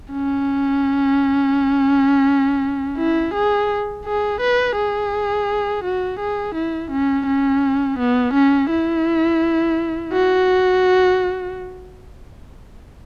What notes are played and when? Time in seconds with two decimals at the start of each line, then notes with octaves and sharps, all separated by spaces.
0.12 C#4
2.97 E4
3.34 G#4
4.05 G#4
4.41 B4
4.76 G#4
5.84 F#4
6.20 G#4
6.55 E4
6.91 C#4
7.27 C#4
7.99 B3
8.34 C#4
8.71 E4
10.13 F#4